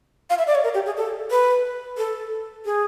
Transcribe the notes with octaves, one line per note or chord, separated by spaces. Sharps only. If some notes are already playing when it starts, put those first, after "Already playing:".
F5
E5
D5
C#5
A#4
G4
G#4
A4
B4
A4
G#4